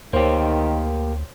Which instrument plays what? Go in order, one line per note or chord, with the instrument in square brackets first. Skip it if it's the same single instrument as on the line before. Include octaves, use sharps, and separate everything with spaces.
[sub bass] D2 [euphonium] D#3 [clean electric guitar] A#3 G4 [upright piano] C5 C#5